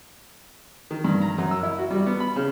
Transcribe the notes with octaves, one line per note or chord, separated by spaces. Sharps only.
D#3
G2
A#5
F#2
E6
E4
F#4
G3
B3
B5
C#3